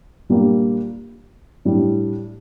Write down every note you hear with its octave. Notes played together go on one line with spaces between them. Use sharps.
A#2 G3 A#3 D4
A2 G3 D4